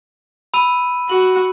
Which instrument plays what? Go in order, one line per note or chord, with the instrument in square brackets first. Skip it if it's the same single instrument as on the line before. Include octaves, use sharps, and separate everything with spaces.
[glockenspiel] B5 E6 D#7
[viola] F#4 [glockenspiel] F#7